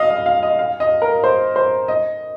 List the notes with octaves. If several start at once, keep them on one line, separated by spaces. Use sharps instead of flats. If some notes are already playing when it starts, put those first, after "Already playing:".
Already playing: D#5 F5
D#5
F5
D#5
F5
D#5
A#4
C5
C5
D#5